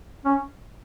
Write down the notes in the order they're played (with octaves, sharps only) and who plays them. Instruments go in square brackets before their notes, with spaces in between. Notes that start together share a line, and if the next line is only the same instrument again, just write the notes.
[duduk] C#4